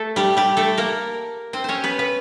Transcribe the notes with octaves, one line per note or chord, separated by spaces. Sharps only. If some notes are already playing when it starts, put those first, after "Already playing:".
Already playing: A3 A4
G3 G4
G3 G4
A3 A4
A#3 A#4
C4 C5
C#4 C5 C#5
B3 B4
B3 B4